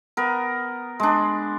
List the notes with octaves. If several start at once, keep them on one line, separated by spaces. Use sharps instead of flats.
B3 A#4
G#3 D4